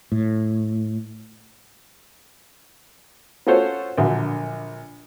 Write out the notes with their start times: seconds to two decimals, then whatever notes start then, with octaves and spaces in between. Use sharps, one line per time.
0.12 A2
3.47 C#4 F4 F#4 A4 C5 C#5
3.98 A#1 D3 F#3